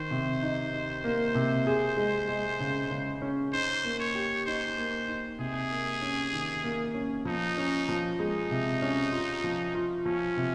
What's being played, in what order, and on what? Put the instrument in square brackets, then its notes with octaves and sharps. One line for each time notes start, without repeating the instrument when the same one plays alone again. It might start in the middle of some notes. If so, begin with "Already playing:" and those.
Already playing: [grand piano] D#3 [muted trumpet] C5
[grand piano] C3
D#4
D#4
A#3
C3
G#4
G#3
G#3
C#3
C#3
C#4
[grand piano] D#4 [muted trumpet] C5
[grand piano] A#3
[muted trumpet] C#5
[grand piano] G4
[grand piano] D#4 [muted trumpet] C5
[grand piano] A#3
D#4
[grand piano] C3 [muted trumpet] G#4
[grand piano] A#3
C#4
D#3
A#3
C#4
[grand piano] F3 [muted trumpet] D#4
[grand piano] C#4
F3
[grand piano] G#3 [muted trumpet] D#4
[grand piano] C3
C#4
F4
F3
F4
[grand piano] F3 [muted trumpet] C#4
[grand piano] C3